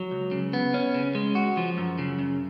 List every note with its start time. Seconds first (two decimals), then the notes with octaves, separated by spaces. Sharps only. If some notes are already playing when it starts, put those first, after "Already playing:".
Already playing: F#3
0.11 C#2
0.31 C#3
0.53 B3
0.74 C#4
0.95 C#3
1.15 G#3
1.35 F#4
1.57 F3
1.78 F#2
1.98 C#3
2.19 F#2